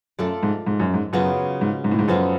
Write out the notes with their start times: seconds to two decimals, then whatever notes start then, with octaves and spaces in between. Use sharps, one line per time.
0.19 F#2 A3 F4 A4 D5
0.43 G#2
0.67 G#2
0.80 F#2
0.94 G#2
1.13 F#2 C#3 F#3 B3 F4
1.61 G#2
1.84 G#2
1.92 A2
1.99 G#2
2.08 F#2 F3 B3 F4 A4